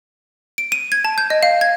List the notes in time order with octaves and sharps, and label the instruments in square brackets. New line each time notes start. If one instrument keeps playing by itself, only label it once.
[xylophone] D7
D#7
G#6
A5
G6
D#5
F5
G#6